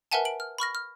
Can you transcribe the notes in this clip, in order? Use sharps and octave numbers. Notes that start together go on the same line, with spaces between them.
A#4 B4 E5 F#5 G#5 A5
D7 F#7
F6
B5 C#6 F6 A#6
F6